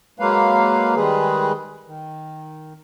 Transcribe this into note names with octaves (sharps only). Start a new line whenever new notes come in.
F#3 G#3 A#3 B4 F5
D#3 G3 G#3 G#4 B4
D#3